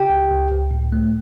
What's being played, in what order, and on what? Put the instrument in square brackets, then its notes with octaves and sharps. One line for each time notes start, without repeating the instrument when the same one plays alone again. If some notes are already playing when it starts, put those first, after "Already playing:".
Already playing: [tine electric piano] C#3 G4 G5
C#2
C#2
C#2
A2
A3